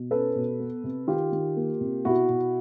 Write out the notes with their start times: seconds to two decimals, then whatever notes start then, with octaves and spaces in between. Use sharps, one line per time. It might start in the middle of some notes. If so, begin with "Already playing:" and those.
Already playing: B2
0.11 C#4 A4 B4
0.35 B2
0.59 B3
0.84 C3
1.08 D#3 F4 G4
1.32 D#3
1.56 A#3
1.81 C3
2.05 B2 E4 F#4
2.29 B2